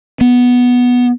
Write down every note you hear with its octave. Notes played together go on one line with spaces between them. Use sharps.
B3